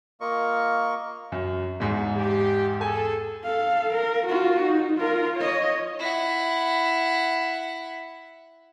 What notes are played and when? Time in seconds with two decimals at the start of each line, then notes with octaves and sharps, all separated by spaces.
0.21 A#3 F4 A#4 D#5 C#6
1.32 F#2
1.80 E2 G#2
2.16 G4
2.81 G#4 A4 G#5
3.43 A4 F5
3.94 A#4
4.27 F4 F#4
4.62 D#4
4.97 F4 A#4
5.37 C#5 D#5
6.00 E4 F#5